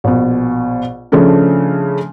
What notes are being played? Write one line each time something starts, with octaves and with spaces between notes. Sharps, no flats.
A#1 B2
C#3 F3 A3 C#4 D4